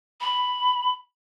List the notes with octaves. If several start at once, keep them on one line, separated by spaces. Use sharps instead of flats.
B5